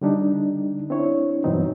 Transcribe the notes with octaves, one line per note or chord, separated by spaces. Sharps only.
D3 G3 D4 D#4
C4 D4 E4 C#5
G2 B2 E3 F#3 C4 D#4